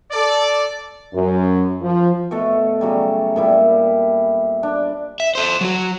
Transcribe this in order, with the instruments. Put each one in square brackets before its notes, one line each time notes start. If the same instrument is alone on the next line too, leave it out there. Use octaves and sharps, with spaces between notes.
[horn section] A4 D5
[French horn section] F#2
F3
[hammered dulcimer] B2 A3 A4
C#3 F#3 G3
A#2 G3 E4
D4
[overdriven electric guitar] E5
A4 C5
F#3 F#4